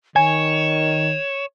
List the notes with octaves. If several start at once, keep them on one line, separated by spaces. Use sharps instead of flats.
D#3 C#5 G#5 E7